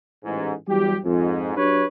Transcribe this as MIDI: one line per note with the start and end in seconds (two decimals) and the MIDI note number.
0.24 0.52 33
0.24 0.52 44
0.67 0.96 40
0.67 0.96 54
0.67 0.96 55
0.67 0.96 67
1.04 1.56 41
1.04 1.56 44
1.57 1.83 54
1.57 1.83 62
1.57 1.83 67
1.57 1.83 71
1.57 1.83 73